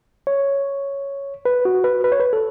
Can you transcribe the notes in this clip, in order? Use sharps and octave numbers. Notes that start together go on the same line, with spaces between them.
C#5
B4
F#4
B4
B4
C#5
B4
A4